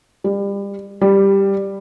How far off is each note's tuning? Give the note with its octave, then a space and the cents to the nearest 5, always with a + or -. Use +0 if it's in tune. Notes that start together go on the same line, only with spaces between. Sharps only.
G3 +30
G3 +5